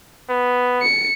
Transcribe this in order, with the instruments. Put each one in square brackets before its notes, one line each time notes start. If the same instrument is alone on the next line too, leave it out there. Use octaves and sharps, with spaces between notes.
[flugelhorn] B3
[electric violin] C#7